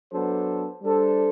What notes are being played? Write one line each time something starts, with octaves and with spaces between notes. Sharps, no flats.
F#3 B3 D4 A4 C5
G3 D4 A4 C5